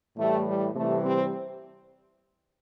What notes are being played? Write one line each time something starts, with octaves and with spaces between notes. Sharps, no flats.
A2 E3 G3 A3
G3
C3 E3 G3 A3
C4